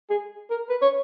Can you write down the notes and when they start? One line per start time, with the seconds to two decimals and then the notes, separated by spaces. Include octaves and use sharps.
0.10 G#4
0.50 A#4
0.69 B4
0.82 C#5